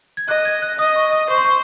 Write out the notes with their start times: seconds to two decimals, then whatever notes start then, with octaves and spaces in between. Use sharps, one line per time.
0.17 G#6
0.28 D#5 F#6
0.45 G#6
0.62 F#6
0.79 D#5 D#6
0.96 C#6
1.13 D#6
1.30 C5 C#6
1.38 C6
1.45 C#6